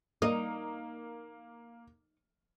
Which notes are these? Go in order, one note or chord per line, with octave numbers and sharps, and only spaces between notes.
A#3 D#4